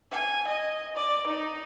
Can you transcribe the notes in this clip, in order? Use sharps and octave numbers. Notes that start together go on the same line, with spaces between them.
G#5
D#5
D5
D#4